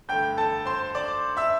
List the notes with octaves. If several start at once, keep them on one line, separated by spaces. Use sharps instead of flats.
G2 D3 A3 G5 G6
A4 A5
C5 C6
D5 D6
E5 E6